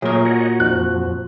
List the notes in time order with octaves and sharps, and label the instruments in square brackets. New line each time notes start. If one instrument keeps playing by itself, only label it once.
[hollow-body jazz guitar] A#2 A#4 [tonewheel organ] F#3 A3 G#4 [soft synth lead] C#5
[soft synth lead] F#4 [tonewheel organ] C#5 D#5 F#5
[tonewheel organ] F2 F3 [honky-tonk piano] F#6